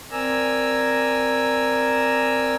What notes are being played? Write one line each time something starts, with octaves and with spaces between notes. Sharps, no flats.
C4 A#4 D5 G#5 A#5 E6